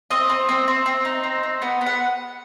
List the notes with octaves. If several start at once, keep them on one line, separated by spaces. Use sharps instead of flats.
C4 D#5
C4
C4
C4
C4
D#4
C4
C4
B3 F#5
B3
F#5